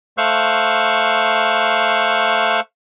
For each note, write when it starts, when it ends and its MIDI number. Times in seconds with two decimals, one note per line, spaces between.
0.18 2.60 57
0.18 2.60 72
0.18 2.60 77
0.18 2.60 85
0.18 2.60 88
0.18 2.60 90